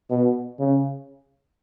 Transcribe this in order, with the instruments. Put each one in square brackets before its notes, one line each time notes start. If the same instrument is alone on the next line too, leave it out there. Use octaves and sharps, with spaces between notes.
[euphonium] B2
C#3